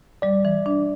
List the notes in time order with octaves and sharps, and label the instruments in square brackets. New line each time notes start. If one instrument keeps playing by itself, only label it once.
[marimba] G3 [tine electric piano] D5
[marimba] E3
D4